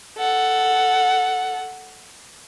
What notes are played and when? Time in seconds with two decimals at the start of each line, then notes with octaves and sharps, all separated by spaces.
0.18 A4 F#5